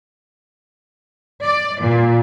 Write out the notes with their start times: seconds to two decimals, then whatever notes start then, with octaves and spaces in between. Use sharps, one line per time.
1.43 D5
1.80 A#2